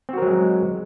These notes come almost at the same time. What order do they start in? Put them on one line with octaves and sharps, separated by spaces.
C4 F#4 A#4 F#3 G#3